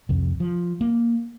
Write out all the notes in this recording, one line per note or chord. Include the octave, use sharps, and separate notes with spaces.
C2 F2
F3
A#3